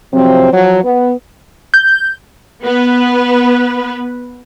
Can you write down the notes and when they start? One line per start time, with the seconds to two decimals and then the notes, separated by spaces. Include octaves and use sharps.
0.13 C3 F3 F#3 C4
0.52 F3 F#3
0.83 B3
1.74 G6
2.62 B3 B4